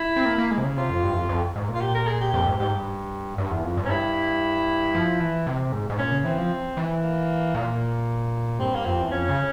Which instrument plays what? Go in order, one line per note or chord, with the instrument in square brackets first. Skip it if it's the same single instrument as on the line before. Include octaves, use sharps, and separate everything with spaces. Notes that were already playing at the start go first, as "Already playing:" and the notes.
Already playing: [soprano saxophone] E4
[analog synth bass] C4
A#3
A#3
G#3
C3
C#3
[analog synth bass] C3 [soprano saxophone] F4
[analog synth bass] F2
G2
E2
F2
F2
G#2
A#2
[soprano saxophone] F4
G4
A#4
G#4
G4
[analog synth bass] F2 [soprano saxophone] G4
[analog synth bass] G#2
[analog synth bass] G#2 [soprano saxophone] G4
[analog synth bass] G2
G2
E2
F2
G2
[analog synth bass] G#2 [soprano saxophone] C#4
[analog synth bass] G2 [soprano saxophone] E4
[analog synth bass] F3
E3
C3
G#2
G#2
[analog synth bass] A#2 [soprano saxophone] C#4
[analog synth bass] C#3
[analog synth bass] E3 [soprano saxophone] C4
[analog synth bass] F3
E3
[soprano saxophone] A#3
[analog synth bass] A#2
[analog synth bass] G2 [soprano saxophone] C4
[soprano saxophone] A#3
[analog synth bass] F2 [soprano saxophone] C4
[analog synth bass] E2
[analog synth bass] F2 [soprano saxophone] C#4
[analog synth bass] C#3